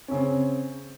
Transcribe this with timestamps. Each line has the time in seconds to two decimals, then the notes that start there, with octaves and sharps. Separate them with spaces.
0.08 C#4
0.11 C#3
0.15 C4